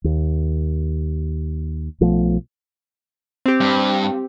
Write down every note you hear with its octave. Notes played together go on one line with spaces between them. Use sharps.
D#2
B1 B2 F3 A3
C4 G4
G2